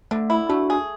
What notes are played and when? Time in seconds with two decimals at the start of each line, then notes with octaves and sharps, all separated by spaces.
0.11 D3 A3
0.30 E4
0.49 A3 D4 F#4
0.70 G#4